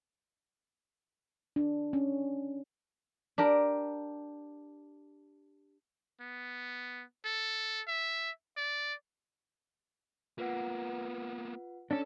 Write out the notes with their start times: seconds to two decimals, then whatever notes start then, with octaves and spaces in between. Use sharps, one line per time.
1.56 D4
1.93 C#4
3.38 D4 G4 A#4
6.21 B3
7.25 A4
7.87 E5
8.57 D5
10.38 A#3 B3 F4 B4 F#5
11.91 C#4 D4 A4